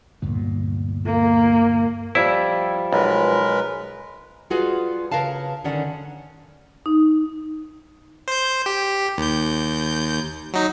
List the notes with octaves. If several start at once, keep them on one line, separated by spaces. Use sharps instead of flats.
D2 G2 A#2 B3
A#3
F3 G3 E4
B1 G#3 A#4 B4
G3 F4 F#4 G#4 B4
C#3 A#4 B4 F5 A5
D3 D#3 C#4 D5 F#5
D#4
C5 G6
G4
D#2 G6
F#3 D#4